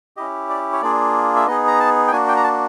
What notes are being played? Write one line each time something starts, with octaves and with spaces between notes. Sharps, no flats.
C#4 E4 G4 D#5
D5
C#5
A#3 D4 F4 G#4 D5
E5
B3 D#4 G#4 D#5
A#5
A5
G5
A#3 D4 F#4 G#5
G5
A#5
A5